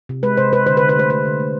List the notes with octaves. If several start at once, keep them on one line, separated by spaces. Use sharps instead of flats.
C3
G#3 B4
C3 C5
C3 B4
D3 C5
B4
D3
B4
A3 C5
A3 B4
D3
A3